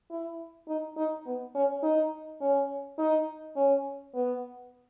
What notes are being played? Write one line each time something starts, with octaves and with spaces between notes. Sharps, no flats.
E4
D#4
D#4
B3
C#4
D#4
C#4
D#4
C#4
B3